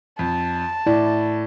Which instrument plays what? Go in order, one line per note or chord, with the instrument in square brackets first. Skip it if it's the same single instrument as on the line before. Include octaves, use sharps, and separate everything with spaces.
[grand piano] F2 [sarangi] A5
[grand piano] A2 [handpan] E4 D5